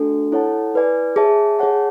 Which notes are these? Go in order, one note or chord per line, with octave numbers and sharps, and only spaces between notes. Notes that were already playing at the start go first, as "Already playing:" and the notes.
Already playing: A3 D4 F#4 A4
E4 A4 C#5 F#5 A5
E4 B4 D5 G#5
G#4 C#5 E5 A5
G#4 C#5 F#5 A5